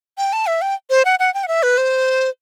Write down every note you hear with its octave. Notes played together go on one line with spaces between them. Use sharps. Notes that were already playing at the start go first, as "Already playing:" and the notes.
G5
A5
E5
G5
C5
F#5
F#5
G5
F#5
E5
B4
C5